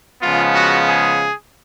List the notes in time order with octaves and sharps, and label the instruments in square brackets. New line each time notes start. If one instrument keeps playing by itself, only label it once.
[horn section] C#3 F3 G#3 B3 F4
F#4
G#4